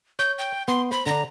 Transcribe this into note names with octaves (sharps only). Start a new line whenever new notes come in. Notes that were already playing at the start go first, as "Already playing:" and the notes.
C#5 G6
G5
B3 C6
C5 B5
D3 D4 A#5